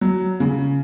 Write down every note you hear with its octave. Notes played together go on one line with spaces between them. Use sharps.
F#3
C#3